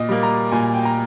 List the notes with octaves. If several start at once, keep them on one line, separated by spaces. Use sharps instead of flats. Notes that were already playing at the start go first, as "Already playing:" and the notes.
Already playing: A#2 D#5
G3 A#3
A#5
A#2 G#5
G5
A#5